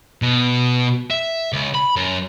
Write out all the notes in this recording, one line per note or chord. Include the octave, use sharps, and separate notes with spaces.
B2
E5
C#2
B5
F#2